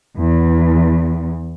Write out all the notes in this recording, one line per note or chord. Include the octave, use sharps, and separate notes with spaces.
E2